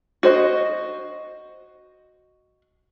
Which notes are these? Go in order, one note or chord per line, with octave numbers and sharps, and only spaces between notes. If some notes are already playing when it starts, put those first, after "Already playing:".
F#4 C5 D#5